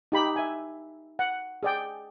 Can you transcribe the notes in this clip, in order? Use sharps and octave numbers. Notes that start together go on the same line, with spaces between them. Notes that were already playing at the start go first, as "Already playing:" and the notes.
D#4 G4 B5
E5 G#5
F#5
G#4 D5 G5